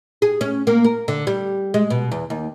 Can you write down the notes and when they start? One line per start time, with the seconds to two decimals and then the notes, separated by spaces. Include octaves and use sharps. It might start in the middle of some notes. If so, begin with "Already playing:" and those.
0.22 G#4
0.41 C#4
0.67 A#3
0.84 A#4
1.08 D3
1.27 G3
1.74 G#3
1.90 B2
2.12 E2
2.30 D#2